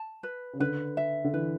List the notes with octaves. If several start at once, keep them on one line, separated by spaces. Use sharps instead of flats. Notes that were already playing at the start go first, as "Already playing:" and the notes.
Already playing: A5
B4
C#3
D3 B4
E5
D3
E3 B4